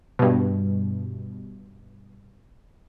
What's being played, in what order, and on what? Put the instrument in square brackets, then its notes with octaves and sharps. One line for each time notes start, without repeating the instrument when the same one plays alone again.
[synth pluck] G2 B2